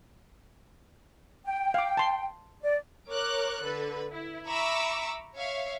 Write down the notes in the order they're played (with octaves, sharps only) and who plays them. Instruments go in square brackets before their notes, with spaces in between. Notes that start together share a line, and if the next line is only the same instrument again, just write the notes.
[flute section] G5
[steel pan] F5 D6
A5 C6
[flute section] D5
[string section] A#4 C#5 D6 F#6
D3 A4 B4
E4
E5 A#5 B5 C#6 D6 E6
C#5 E5 F5